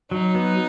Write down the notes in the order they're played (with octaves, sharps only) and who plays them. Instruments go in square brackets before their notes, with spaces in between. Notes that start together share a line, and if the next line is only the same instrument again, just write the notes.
[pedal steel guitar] F#3 [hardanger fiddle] D#4
[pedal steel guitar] B3